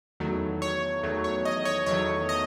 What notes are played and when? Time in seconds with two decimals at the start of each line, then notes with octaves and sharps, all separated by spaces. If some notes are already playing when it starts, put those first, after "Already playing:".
0.20 E2 D#3 F#3 A3
0.62 C#5
1.03 E2 D#3 F#3 A3
1.24 C#5
1.45 D#5
1.65 C#5
1.86 E2 D#3 F#3 A3 C#5
2.29 D#5